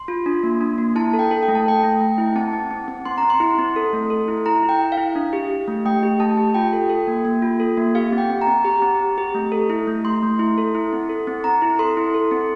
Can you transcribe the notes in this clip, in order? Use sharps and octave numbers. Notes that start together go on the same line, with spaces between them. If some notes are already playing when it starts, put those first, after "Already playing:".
Already playing: C6
F4
D4
A#3
D4
A#3
E4 A5
A4
G5
A4
G5
A3
A5
A4 G5
A3
A3
E4
C4 A5
C4
C4
C4
C4 C6
A#5
C4
C6
E4
C4
A4
A3
A4
E4
E4 A#5
E4
G5
E4
F5
E4
D4
G4
G4
A3
A3 G5
G4
A3 A5
G4
F4 G5
A4
A4
A#3
A#3
F4
A4
A#3
G4 F5
C4
G5
C4
A#5
C4
G4 A#5
C4
C4
G4
A3
A4
E4
A3
A3 C6
A3
E4
A4
E4
C4
A4
C4
C4 A#5
E4
A4 C6
E4
A4
C4